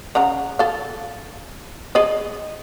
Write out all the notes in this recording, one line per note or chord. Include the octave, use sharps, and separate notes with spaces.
C#3 F#5 A#5
A4 F5
G#4 D5 D#5